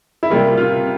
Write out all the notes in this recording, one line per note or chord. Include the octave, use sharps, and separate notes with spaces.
E4
C3 G3 A#3 F4
F4